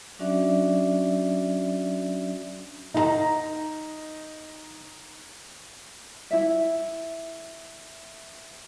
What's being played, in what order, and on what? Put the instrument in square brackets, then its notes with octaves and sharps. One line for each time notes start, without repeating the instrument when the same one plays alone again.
[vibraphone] F#3 C#4 D4 F#4 D5 E5
[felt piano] D#4 A#5
[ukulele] E4 E5